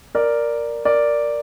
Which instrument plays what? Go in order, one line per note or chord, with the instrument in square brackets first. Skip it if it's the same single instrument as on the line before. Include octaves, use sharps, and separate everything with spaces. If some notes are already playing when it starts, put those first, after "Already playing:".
[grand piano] A#4 D5
A#4 D5